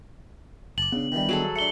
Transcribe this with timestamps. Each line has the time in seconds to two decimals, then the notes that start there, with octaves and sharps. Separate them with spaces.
0.78 F#1 A5 D6 F#7
0.92 C#3 B3 D4
1.12 D#3 E3 G3
1.29 F#3 G#4 A4
1.56 A3 D4 C#7 G7